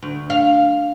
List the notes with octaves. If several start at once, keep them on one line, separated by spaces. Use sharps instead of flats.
D2
F5